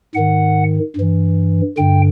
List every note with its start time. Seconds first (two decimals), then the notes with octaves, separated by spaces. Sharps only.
0.15 G#2 D#3 F#5
0.96 G2 E3
1.77 G2 D3 G5